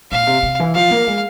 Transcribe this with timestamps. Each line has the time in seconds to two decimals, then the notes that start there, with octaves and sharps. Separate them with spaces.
0.12 A#2 F5
0.27 C3
0.43 C3
0.60 E3
0.75 F3 F5
0.91 A#3
1.07 G#3